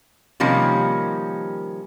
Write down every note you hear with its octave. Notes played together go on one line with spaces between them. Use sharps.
C3 D#3 F3 G3 A#3 C#4